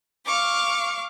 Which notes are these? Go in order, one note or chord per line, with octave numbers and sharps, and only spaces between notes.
F5 C#6 D6